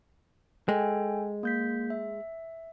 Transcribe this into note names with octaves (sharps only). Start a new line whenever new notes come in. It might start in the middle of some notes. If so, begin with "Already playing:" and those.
G#3 A4 G5 G#5
A#3 G6 B6
E5